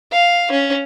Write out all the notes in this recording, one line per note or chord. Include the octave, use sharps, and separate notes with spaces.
F5
C#4